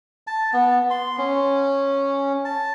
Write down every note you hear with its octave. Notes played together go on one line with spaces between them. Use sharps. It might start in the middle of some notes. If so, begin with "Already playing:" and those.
A5
B3
C6
C#4
A5